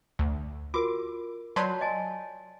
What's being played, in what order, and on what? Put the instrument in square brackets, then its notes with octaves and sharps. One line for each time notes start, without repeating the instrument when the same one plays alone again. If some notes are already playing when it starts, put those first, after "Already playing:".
[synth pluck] D2
[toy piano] F4 F#4 A#4 [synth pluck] D6
[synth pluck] F#3 B5 C6 [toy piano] C#5 D5 A5
[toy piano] D#5 G#5 A5